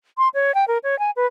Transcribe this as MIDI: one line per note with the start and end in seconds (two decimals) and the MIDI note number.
0.18 0.28 84
0.34 0.54 73
0.55 0.65 79
0.68 0.78 70
0.83 0.98 73
0.99 1.11 80
1.16 1.26 71